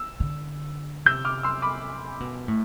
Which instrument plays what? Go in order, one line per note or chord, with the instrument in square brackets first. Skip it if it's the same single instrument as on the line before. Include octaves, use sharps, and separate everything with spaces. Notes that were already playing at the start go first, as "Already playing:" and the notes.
Already playing: [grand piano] E6
[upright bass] D3
[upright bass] C3 [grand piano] E6 G6
[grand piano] D6 F6
C6 E6
B5 D6
[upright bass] B2
A2